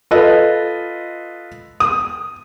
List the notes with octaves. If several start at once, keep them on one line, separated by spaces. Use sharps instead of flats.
F4 A4 B4 D#5
D#6